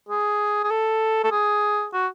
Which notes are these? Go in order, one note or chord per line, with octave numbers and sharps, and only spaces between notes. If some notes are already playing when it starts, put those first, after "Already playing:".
G#4
G#4
A4
A4
G#4
F#4